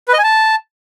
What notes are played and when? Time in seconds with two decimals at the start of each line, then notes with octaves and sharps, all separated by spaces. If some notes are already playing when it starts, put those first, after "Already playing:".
0.08 B4
0.13 D#5
0.18 G#5
0.23 A5